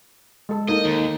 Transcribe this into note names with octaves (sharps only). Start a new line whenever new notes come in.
G#3 A4
A#3 D#4 A4 A#4 D#5
D#2